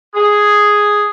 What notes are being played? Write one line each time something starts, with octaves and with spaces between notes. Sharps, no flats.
G#4